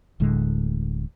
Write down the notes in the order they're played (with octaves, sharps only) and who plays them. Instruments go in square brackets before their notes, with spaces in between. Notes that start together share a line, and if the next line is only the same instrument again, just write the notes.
[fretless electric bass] D1 A2 D3 G#3